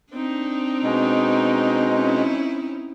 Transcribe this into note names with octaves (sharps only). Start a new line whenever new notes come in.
C4 D4 D#4
B2 G#3
C#4 E4